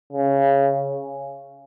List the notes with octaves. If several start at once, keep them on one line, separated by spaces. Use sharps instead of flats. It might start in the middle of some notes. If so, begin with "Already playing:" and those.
C#3